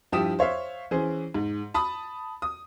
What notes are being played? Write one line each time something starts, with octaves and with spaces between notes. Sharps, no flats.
G2 F3 E4 G4 D#6 E7
C5 C#5 E5 F5
E3 C#4 G#4 C5
G#2
A5 B5 D#6
D#6